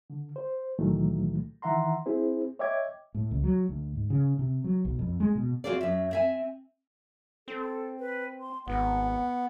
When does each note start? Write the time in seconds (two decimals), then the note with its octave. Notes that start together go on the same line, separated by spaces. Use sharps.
0.10 D3
0.36 C5
0.79 C#2 A#2 D#3 E3 F#3 A3
1.62 D#3 E3 E5 F#5 A#5 C6
2.06 C4 E4 G#4 C5
2.59 C#5 D#5 E5 G5 D6 G#6
3.15 A2
3.31 C#2
3.43 F#3
3.69 D2
3.95 G#2
4.10 C#3
4.39 C3
4.64 F#3
4.85 B1
4.99 F2
5.20 G#3
5.35 B2
5.64 C4 F4 F#4 G#4 D5
5.81 F#2 E5
6.11 C4 E5 G#5
7.48 C4 A4
7.99 B4
8.40 C6
8.67 G#1 B3 F#5